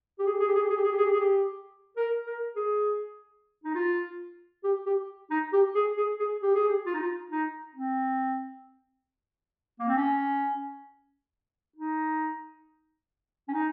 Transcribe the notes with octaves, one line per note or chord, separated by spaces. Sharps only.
G4
G#4
G4
G#4
G4
G#4
G4
G#4
G4
G#4
G4
G#4
G4
G#4
G4
A#4
A#4
G#4
D#4
F4
G4
G4
D#4
G4
G#4
G#4
G#4
G4
G#4
G4
F4
D#4
F4
D#4
C4
A#3
C4
C#4
D#4
C#4
D#4